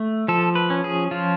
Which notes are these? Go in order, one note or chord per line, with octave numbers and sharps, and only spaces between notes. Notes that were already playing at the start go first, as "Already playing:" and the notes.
Already playing: A3
F3 A4
B4
C#4
G#4
F3 F4